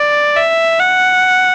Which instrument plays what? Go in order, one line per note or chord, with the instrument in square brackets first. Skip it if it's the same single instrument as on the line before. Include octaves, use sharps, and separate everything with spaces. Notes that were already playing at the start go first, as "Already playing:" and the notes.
Already playing: [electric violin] D5
E5
F#5